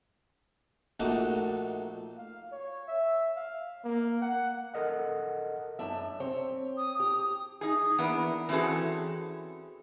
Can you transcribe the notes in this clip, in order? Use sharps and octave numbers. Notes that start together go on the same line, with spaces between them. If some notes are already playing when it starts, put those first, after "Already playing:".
A#1 A3 A#3 D#4 F#4 D6
F5
C#5
E5
F5
A#3
F#5
A4 A#4 D#5 F#5
F#2 D4 E5
C4 G4 C#5
D#6
G4 D#6
D#4 G#4
E3 A#3 B3 D4
E3 C4 C#4 F#4 G#4 A4